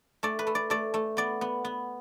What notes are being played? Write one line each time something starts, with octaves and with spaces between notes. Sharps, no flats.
A3 D5
B4
A3
D5
A3 D5
A3
B3 D5
B3
B3